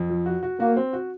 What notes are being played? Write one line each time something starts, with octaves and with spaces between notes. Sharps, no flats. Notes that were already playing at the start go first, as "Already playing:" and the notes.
Already playing: F2
F3
F#4
F#4
A#3 F#4
C4
F#4